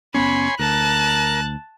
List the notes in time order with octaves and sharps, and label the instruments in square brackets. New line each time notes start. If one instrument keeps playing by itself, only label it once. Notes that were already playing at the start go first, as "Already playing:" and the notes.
[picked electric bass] F#1 B3 C#4 [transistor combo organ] C#5 G#5 C6 [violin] B5
[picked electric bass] D2 [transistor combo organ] A#4 [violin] A5 F#6